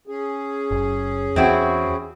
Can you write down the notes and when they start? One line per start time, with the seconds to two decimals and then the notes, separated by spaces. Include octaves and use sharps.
0.08 C#4 G#4
0.71 F#1
1.36 E2 C4 E4 F#4